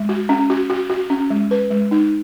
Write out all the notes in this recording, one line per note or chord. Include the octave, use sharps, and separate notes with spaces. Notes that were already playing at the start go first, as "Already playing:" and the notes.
Already playing: G#3
F#4
C#4
F#4
F#4
F#4
C#4
G#3
B4
G#3
D#4